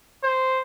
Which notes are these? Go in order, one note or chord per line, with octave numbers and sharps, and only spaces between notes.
C5